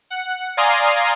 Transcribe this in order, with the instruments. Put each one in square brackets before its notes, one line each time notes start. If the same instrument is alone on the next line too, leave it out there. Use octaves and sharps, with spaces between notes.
[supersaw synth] F#5
D5 F5 G#5 A#5 C6 D#6